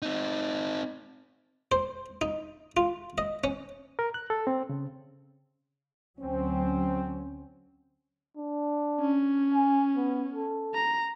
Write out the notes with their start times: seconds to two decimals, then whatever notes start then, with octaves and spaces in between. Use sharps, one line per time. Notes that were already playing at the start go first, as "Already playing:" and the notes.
0.02 C4 D#4
1.72 C5
2.21 D#4
2.77 F4
3.18 D#5
3.44 C#4
3.99 A#4
4.14 F#6
4.30 A4
4.47 C4
4.69 C#3
6.20 D2 F#3 C4 C#4
8.37 D4
9.00 C#4
9.54 G#5
9.96 B3
10.34 A4
10.75 A#5